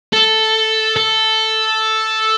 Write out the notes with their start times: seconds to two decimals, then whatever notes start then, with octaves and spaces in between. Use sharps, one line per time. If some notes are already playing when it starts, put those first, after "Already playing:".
0.13 A4
0.96 A4